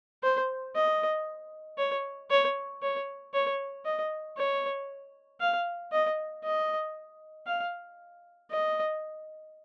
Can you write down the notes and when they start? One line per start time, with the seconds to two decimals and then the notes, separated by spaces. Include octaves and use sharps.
0.23 C5
0.75 D#5
1.78 C#5
2.30 C#5
2.82 C#5
3.34 C#5
3.86 D#5
4.37 C#5
5.40 F5
5.93 D#5
6.44 D#5
7.47 F5
8.51 D#5